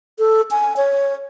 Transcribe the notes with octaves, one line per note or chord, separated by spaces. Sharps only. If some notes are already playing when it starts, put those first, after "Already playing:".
A4
G#5
C#5